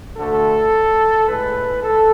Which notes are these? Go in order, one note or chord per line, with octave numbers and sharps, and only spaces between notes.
D2 D3 A3 A4
A2 G#3 B4
A4